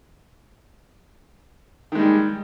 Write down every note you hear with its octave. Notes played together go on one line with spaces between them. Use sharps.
D#3 G3 G#3